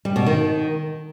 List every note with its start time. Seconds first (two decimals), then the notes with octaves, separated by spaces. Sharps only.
0.05 G3
0.16 B2
0.26 D#3